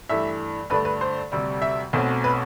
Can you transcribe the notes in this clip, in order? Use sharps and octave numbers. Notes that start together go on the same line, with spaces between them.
G2 E3 A3 E5
G2 D3 A3 D4 B4
B4
C5
D2 C3 G3
E5
B1 B2 A3 C4
B4